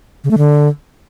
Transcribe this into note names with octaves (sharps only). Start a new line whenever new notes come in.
C#3
A3
D3